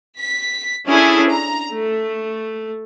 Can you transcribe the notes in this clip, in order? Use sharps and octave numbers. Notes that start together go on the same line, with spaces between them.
B6
C#4 D4 E4 G#4 A4
A#5
A3